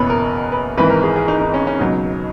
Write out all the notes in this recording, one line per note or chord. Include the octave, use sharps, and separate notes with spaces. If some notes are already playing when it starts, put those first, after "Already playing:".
Already playing: F#1 E2 B2 B4 C#5
A#4
B4
G#1 G#2 E3 B4
A#4
G#4
G#4
D#4
D#4
C#4
C#4
C#2 B2 F#3 D#4